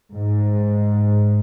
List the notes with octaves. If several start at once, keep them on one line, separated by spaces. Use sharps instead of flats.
G#2